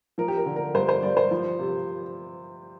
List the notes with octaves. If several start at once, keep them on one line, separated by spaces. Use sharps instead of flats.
F3 A#4
G4
A#4
D3
A#4
G2 C5
C5
G2 D5
C5
F3
C3